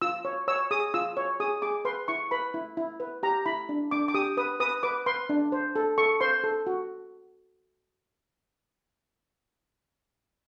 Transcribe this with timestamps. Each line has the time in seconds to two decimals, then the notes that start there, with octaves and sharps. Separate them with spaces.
0.01 F4 E6
0.25 C#5
0.48 C#5 E6
0.71 G#4 D#6
0.94 F4 E6
1.17 C#5
1.40 G#4 D#6
1.62 G#4 D6
1.85 B4 C6
2.08 E4 C#6
2.31 B4 B5
2.54 E4
2.77 E4
3.00 B4
3.23 G4 A#5
3.46 E4 B5
3.69 D4
3.91 D4 D6
4.08 D6
4.14 G4 D#6
4.37 B4 D#6
4.60 B4 D#6
4.83 B4 D6
5.06 B4 C6
5.29 D4
5.52 C5
5.76 A4
5.98 A4 C#6
6.21 C5 C6
6.44 A4
6.67 F#4